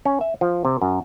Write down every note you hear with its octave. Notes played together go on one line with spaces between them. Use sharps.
C#4
E5
F3
C3
F#2